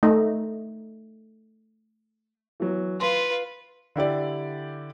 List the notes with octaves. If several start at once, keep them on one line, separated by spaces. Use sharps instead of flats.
A3 D#4
E3 F#3 B3
F4 B4 C6
D3 E4 G4 D5